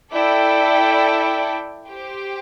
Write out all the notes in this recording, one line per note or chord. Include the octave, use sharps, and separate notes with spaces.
E4 A4 D5 G5
G4 C5 G5